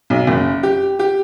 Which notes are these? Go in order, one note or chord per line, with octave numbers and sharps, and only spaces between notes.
B1
F#1
G4
G4